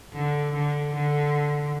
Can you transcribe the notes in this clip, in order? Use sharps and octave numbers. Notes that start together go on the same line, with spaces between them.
D3
D3
D3